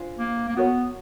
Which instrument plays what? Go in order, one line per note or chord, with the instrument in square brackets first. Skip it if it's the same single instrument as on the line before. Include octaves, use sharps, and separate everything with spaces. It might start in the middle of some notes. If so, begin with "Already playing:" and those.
Already playing: [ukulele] D4 F4 G#4 C5
[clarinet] A#3
A#3
[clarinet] B3 [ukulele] F#4 A#4 C#5